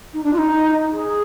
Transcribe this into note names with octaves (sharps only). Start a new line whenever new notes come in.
D#4
D4
F4
D#4
G#4